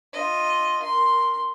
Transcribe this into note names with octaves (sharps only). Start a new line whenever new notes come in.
F4 D#5
A#4 C6